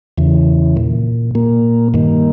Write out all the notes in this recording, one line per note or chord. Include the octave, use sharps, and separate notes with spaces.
E2 C#3 E3
A#2
A#2 A#3
G2 D#3 A#3